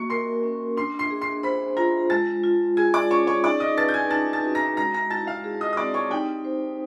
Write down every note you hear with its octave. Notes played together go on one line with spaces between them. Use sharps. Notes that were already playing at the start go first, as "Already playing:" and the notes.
Already playing: A#3 F#4 C#6 C#7
A#4 C6 C7
C#4
D4 C6 C7
C6 C7
G#4
C6 C7
C5 B5 B6
F4 A#5 A#6
G#3 A5 A6
F4
G#4 G#5 G#6
D5 D6
C#4 C#5 C#6
C#5 C#6
D#4 D5 D6
D#5 D#6
B4 A5 A6
G6
G#5 G#6
D#4 A5 A6
A5 A6
F#4
A#5 A#6
G#3 A#5 A#6
A#5 A#6
E4 A5 A6
F5 F6
G#4
D#5 D#6
D#6
C4 D5 D6
C#5 C#6
D#4 G4 G5
C5